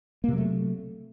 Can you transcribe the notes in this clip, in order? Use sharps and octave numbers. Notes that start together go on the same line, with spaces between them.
C3 F#3 A3 A#3